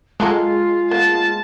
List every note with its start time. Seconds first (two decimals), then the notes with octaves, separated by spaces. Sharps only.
0.20 F#3 G#3 A#3 F4 A4
0.91 A#3 B3 A5